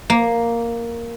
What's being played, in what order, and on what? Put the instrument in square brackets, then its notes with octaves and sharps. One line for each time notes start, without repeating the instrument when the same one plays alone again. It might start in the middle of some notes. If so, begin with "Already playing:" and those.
[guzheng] A#3